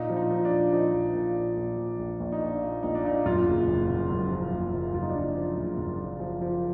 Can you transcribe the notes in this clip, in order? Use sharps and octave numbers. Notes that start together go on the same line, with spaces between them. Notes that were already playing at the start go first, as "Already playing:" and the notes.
Already playing: A#2 D#4
F3
D#4
F3
D4
A#2
F3 D#4
A#1
A#2
A#2
A#1
F3
A#1
A#1
D#4
A#2 D4
A#2
A#1 D#4
D4
A#2 D#4
F#2 F4
F#1
F#1
F#2
F#2
F3
F#1
F#1
F#1 F4
D#4
D4
F#1 D#4
F3
F#1
F#2
F3
F3
F3